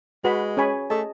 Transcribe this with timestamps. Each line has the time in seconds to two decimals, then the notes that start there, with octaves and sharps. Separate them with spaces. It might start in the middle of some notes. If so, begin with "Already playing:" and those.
0.24 G#3 F#4 B4 F#5 B5
0.57 C#4 G#4 C#5 G#5 B5
0.90 A3 G#4 D#5 A5